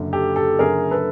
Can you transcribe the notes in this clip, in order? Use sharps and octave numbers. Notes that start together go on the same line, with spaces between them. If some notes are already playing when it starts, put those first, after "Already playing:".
Already playing: F#1 F#2 D3
G4 A4
G4 A4
F#1 F#2 D3 G#4 A#4
A4 B4